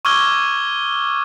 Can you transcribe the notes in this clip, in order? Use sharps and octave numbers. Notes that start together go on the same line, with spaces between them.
C#6 D6 E6 F6 G#6 G7